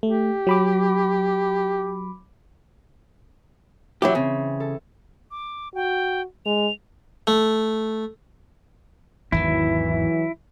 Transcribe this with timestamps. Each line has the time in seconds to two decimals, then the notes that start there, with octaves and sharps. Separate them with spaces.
0.03 A3 G4
0.47 F#3 B5 D6
4.02 E3 F#3 E4 G4
4.15 C#3 C4
4.60 A4
5.31 D6
5.75 F#4 G5
6.46 G#3 F7
7.27 A3
9.32 G#1 E2 D#3 E3 F#3 E4